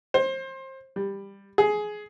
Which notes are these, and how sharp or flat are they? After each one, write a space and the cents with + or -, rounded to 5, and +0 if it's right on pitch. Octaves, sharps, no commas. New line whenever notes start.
C5 +25
G3 +15
G#4 +15